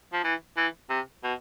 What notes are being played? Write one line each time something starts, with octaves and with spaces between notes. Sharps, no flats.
F3
E3
E3
C3
B2